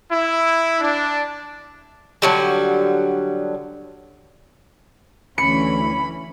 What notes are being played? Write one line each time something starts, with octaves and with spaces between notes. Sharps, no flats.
E4
D4
D3 F#3 G3
D2 E3 C#4 B5 C#7